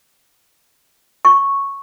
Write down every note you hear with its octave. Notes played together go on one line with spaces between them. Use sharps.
C#6